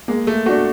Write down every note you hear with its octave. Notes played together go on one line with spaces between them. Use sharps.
G#3 A#3
A3
A3 D4 F#4